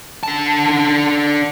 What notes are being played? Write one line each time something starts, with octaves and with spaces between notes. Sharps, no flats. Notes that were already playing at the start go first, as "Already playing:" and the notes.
D3 A5